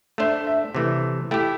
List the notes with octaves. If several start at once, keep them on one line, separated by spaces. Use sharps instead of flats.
A3 D4 C5 E5
E5
C3 E3 A3
A3 E4 G4 G5